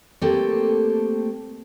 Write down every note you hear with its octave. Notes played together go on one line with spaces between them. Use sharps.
A3 A#3 C4 G4 A4